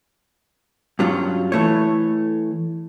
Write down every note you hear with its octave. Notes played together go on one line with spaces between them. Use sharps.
G2 F#3 C#4 F4
E3 A3 C#5